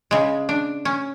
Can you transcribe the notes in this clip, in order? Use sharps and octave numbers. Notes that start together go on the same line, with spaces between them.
C#3 G#3
D4
C#4